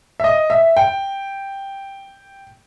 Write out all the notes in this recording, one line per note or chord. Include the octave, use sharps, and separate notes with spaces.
E5
D#5
E5
G5